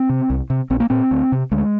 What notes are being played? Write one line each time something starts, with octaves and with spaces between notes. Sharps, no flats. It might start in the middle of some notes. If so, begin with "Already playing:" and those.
Already playing: C4
C3
C2
C3
A#1 C4
A#3
A#2 C4
D2
C3
D2 G#3